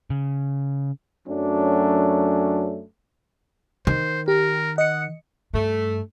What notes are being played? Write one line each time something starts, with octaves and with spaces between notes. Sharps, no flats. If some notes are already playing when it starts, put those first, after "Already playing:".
C#3
F#2 F#3 A3 C#4 D4
D#3 C5
G4 A#4
D#5 F#5 C#7
G2 A3